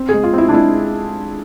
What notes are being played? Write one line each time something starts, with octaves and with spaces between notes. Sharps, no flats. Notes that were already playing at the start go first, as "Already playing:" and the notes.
Already playing: C4
G#4
G#3
F4
C4 E4
D4
G#3 E4